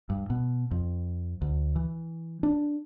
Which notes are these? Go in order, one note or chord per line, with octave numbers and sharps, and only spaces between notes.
G2
B2
F2
D2
E3
D4